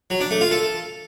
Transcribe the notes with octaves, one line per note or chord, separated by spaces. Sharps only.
F#3
D4
A3
F4
A4